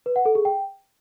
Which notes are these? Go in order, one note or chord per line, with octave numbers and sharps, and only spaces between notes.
B4
F#5
A4
G#4
G5